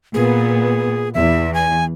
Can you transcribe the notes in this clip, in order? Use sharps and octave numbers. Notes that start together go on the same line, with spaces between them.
A#2 B3 G#4
E2 E5
G#5